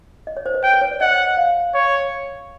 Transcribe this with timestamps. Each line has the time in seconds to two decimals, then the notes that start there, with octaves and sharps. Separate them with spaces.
0.27 D#5
0.37 C#5
0.46 C5
0.55 B4
0.63 G5
0.73 B4
0.82 C#5
0.91 D5
1.01 D#5 F#5
1.37 F5
1.74 C#5